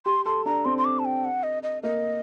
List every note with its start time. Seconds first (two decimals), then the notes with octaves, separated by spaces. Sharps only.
0.06 G4 C6
0.25 A4 C6
0.45 D4 A#5
0.65 C4 C6
0.78 C6
0.85 D6
0.99 A5
1.05 G5
1.25 F#5
1.43 D#5
1.63 D#5
1.83 A#3 D#5